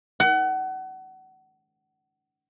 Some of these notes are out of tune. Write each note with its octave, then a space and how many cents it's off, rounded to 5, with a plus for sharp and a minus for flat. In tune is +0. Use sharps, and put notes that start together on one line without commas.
F#5 +30